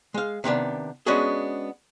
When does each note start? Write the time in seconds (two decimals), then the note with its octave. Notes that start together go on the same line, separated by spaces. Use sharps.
0.14 G#3 F5
0.44 C3 D#3 B3 D4
1.06 G#3 B3 C#4 D4 F#4 G#4